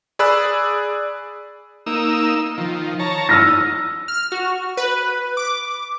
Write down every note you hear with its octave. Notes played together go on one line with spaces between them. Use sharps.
G#4 D5 B5 E6 F#6
A#3 D#4 E6
D#3 F3
C#5 A5 A#5
D#4 E6 F6 A#6
F6
F#4
B4
D6